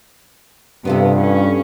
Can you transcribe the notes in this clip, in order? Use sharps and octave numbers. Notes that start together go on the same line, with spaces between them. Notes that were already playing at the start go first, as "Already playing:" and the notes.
G2 C3 B3 F4 A4
C#4